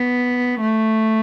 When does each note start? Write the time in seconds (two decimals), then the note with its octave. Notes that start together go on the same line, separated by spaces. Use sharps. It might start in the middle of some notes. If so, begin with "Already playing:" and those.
Already playing: B3
0.61 A3